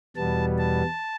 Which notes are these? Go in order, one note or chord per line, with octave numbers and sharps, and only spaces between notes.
E2 B2 G3 B3 A5
A5